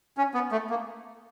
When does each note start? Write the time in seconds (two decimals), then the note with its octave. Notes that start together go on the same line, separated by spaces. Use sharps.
0.17 C#4
0.34 B3
0.52 A3
0.70 A#3